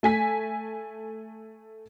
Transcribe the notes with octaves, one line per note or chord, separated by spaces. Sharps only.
A3 G#5 B6